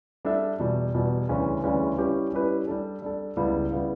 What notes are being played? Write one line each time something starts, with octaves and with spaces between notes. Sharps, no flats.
G3 D4 A4 E5
E2 B2 G3
E2 B2 G3
D2 C#3 E3 G3 C#4
D2 C#3 E3 G3 C#4
G3 C#4 E4 G4 B4
G3 C#4 E4 G4 B4
G3 D4 A4
G3 D4 A4
C#2 C#3 G3 B3 E4
C#3 G3 B3 E4